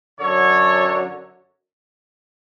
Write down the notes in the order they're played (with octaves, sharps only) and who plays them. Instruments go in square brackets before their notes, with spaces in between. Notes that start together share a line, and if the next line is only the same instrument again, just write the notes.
[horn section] F#2 D3 F#3 A4 C#5